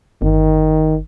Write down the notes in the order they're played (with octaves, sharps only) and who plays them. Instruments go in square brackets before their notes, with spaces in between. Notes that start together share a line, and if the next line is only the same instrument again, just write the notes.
[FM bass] G1 [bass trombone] D#3